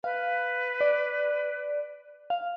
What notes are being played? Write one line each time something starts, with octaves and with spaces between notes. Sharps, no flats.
B4 F5
D5
F5